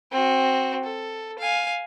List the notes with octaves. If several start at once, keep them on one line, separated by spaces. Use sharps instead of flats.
C4 F#4
A4
F5 G#5